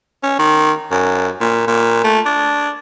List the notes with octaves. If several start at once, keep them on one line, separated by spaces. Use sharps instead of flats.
C#4
D#3
F#2
A#2
A#2
A3
D4